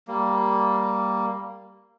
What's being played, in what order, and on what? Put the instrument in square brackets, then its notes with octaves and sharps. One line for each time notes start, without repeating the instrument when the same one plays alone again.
[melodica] G3 A#3